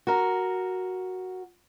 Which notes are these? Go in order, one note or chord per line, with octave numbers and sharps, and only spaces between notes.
F#4 A#4